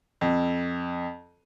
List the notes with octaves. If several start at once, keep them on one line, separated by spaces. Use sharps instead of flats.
F2